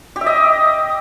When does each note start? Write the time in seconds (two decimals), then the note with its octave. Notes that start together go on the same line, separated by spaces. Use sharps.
0.16 G4
0.21 E5
0.26 D#5